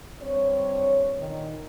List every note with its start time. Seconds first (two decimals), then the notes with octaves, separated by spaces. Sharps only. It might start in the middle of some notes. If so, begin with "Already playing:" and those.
0.22 G2 C4 C#5
1.19 A#2 D#3